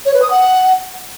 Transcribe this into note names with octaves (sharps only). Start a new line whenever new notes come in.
C#5
B4
D#6
F#5